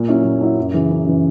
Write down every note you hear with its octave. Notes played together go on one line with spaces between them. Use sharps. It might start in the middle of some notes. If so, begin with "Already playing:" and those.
Already playing: A#2
F#3 C#4 E4
A#2
F#3 C#4 E4
F#2
C#3 E3
F#2
C#3 E3